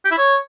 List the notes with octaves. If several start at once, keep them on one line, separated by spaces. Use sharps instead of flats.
G4
E4
C#5